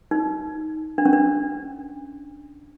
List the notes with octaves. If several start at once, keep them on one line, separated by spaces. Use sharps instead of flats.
D#4
D4
C#4
D4